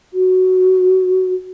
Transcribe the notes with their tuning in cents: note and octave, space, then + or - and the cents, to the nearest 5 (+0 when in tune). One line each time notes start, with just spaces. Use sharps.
F#4 +5